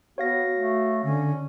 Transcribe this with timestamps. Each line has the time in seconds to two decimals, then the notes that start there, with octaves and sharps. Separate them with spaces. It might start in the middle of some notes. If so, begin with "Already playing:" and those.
0.18 B3 F#4 C#5 F5 A#6
0.54 A3
1.04 D3 C#4